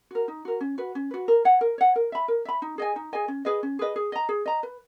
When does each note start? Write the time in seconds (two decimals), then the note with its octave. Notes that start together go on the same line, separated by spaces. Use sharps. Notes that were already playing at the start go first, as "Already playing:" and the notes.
0.11 F#4 A#4
0.28 D#4
0.45 F#4 A#4
0.61 C#4
0.78 F#4 B4
0.95 C#4
1.11 F#4 B4
1.28 A#4
1.45 C#5 F#5
1.61 A#4
1.78 C#5 F#5
1.96 A#4
2.12 E5 B5
2.28 A#4
2.45 E5 B5
2.62 D#4
2.78 G#4 D#5 G#5
2.96 D#4
3.13 G#4 D#5 G#5
3.28 C#4
3.45 G#4 B4 D#5
3.63 C#4
3.79 G#4 B4 D#5
3.96 G#4
4.12 D#5 A#5
4.29 G#4
4.46 D#5 A#5
4.63 B4